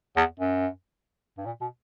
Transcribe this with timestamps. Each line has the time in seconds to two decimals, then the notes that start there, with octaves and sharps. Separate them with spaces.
0.16 E2
0.39 F#2
1.38 G2
1.46 A#2
1.61 B2